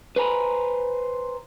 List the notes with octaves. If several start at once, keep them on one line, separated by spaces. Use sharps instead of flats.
B4 C5 G#5 A#5 B5